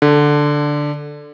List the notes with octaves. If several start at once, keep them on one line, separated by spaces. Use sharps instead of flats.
D3